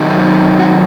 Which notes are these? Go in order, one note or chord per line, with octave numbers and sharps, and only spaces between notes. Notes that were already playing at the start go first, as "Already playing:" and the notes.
Already playing: D#3 F#3 C4 D#4
F#4